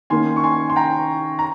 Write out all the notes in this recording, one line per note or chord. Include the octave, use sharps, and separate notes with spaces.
D#3 A#3 C#4 G#5 C6
C#6
G#5 C6
C6
G5 A#5
A#5